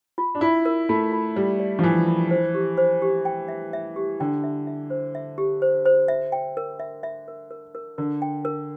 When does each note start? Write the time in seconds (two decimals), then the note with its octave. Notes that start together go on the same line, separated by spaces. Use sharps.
0.18 F4
0.35 D4
0.41 E4 F4
0.65 A#4
0.89 A3 F4
1.12 F4
1.36 G3 D5
1.59 D5
1.79 F3
1.83 E3 A#4
2.07 F4
2.31 C5
2.55 G4
2.78 C5
3.02 G4
3.25 G5
3.48 E5
3.73 E5
3.96 G4
4.20 D3 G5
4.44 E5
4.67 E5
4.90 C5
5.15 E5
5.38 G4
5.62 C5
5.86 C5
6.08 E5
6.32 G5
6.57 A#4
6.80 E5
7.03 E5
7.28 A#4
7.51 A#4
7.75 A#4
7.98 D3 A#4
8.22 G5
8.45 A#4